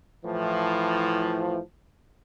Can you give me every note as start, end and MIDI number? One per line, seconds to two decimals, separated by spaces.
0.25 1.59 45
0.25 1.59 52
0.25 1.59 53